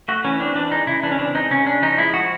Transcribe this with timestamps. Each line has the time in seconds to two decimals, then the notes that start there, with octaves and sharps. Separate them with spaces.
0.08 A3 F#4
0.24 E3 C#4
0.40 C4 D4
0.55 E3 D4
0.72 G#3 D#4
0.87 C#3 E4
1.03 E3 D4
1.12 C#4
1.19 C4 D4
1.35 G#3 D#4
1.50 C#3 C#4
1.66 C#4 D4
1.82 F3 D#4
1.98 G#3 E4
2.14 F3 F#4